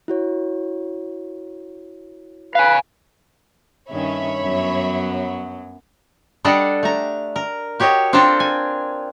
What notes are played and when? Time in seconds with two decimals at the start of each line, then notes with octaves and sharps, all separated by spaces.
0.08 E4 F#4 C#5
2.55 B4 F5 G#5
3.90 G2 D#3 C#4 C#5 E5 B5
4.41 F#2 F#3 B3
6.45 G3 D4 A4 D5 D#5 F#5
6.83 A3 A#5
7.36 A#4
7.80 F#4 G4 C#5 D#5
8.13 C4 D4 F4 A4 A#4 C5
8.40 G#5